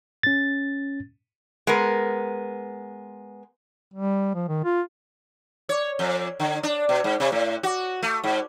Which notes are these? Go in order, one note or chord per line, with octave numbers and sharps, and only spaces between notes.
C#4 A6
G#3 B3 A#4
G3
F3
D#3
F4
C#5
F2
D3
D4
B2
G#2
C3
A2
F#4
A3
G#2